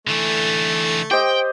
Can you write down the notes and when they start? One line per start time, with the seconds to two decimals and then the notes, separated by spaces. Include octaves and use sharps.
0.07 D3 E3 A3
1.11 G4 C5 D#5 G5